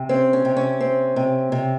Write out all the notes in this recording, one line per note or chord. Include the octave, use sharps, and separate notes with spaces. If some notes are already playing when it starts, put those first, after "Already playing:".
Already playing: C3
C4 C#4
C#4
C3
C#4
C4
C3
C3